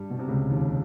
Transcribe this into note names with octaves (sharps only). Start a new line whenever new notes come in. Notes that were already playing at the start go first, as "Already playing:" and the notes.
Already playing: G2 G3
B2
C3
C#2 C#3
D#2 D#3